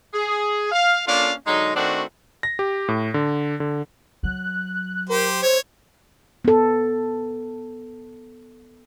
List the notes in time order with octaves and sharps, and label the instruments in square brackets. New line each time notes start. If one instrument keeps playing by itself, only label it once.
[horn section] G#4
F5
A#3 C#4 D4 F4 A4 F5
D3 F#3 G#3 D#4
D#3 A3 C4 D4 F#4
[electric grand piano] A#6
G4
A2
D3
D3
[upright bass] F#3 [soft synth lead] F#6
[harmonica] G4 C5 [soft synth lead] A#4
[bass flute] C5 [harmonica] C#5 [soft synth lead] G#6
[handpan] B3 A4